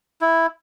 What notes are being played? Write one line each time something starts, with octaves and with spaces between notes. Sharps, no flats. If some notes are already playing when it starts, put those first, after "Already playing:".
E4